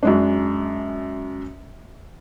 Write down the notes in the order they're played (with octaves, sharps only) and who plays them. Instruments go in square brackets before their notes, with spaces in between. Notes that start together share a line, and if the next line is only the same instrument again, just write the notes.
[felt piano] F#2 G#3 D4